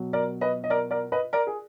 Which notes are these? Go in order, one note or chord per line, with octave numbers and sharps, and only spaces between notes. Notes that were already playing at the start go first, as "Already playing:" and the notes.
Already playing: B2 F#3
A#4 D5
B4 D#5
D#5
A#4 D5
A#4 D5
B4 D#5
A#4 D5
G#4